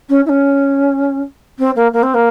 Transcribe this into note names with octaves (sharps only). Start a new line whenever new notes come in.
C#4
E4
C#4
C4
A#3
A#3
C4
A#3